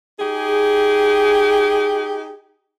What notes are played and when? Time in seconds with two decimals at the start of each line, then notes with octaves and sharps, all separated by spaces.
0.19 D#4 G4 G#4